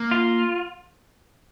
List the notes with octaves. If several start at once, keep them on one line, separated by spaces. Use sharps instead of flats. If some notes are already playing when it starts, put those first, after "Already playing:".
Already playing: A#3
F4